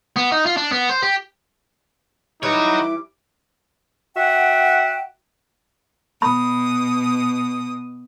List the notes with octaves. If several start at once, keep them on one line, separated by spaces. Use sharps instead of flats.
B3
D#4
F4
D4
B3
C5
G4
E3 G3 D#4 E4 F#4 C#5 D6
F#4 E5 F#5 G5
B2 B5 D#6